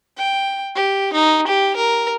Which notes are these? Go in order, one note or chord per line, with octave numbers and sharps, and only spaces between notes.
G5
G4
D#4
G4
A#4